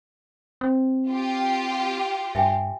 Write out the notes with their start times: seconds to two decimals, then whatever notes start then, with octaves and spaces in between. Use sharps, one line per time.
0.61 C4
1.10 F4 G4
2.35 G2 E5 G5 G#5